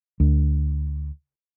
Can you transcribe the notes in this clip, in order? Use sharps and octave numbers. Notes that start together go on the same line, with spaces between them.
D2